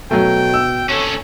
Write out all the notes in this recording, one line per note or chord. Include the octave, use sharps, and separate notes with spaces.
B2 F#3 A3 G5
E6
C#4 A4 C#5